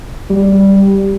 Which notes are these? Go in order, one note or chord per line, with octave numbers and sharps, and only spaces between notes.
G3